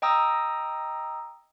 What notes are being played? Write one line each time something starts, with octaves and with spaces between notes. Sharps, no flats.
D#5 G5 A#5 D#6 E6